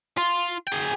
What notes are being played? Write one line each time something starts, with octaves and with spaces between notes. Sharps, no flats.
F4
G#4 G5